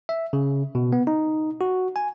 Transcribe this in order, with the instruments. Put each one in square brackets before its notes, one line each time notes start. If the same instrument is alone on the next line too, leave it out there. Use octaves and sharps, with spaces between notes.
[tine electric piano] E5
C#3
B2
B3
D#4
F#4
G#5